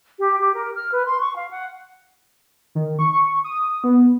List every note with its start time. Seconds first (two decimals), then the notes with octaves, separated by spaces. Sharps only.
0.19 G4
0.40 G4
0.54 A#4
0.74 F6
0.92 B4
1.05 C6
1.20 C#6
1.36 F5
1.50 F#5
2.75 D#3
2.99 C#6
3.13 C#6
3.44 D#6
3.84 B3